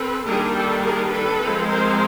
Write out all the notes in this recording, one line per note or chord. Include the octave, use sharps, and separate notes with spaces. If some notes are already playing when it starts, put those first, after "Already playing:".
Already playing: C4 A4 B4
D#3 G3 A#3 D4 G#4 A#4
G4 A4
G#4 A#4
A4 B4
F3 G#3 C4
A#4 C5